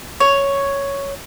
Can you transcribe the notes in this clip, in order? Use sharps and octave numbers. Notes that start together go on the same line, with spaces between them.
C#5